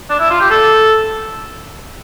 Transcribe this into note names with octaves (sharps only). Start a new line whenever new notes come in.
D4
E4
F4
G4
A4